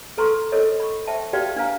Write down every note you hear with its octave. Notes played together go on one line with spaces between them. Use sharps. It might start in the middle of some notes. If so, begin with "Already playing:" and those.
A4 B4 A#5 C6 C#6
A4 A#4 C5 C#5 D#5
B5 C#6
C5 E5 G5 A5
F#4 G4 B4 D5 F5 G5
D4 B4 F5 A#5